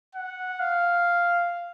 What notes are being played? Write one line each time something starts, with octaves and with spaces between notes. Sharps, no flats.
F#5
F5